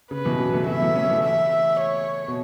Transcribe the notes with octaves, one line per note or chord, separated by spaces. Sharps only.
C#3 B4
B2 E3
C#3 F#3
E3 A3
F#3 B3 E5
E3 A3
A3 C#4
E3 A3
E5
C#5
B2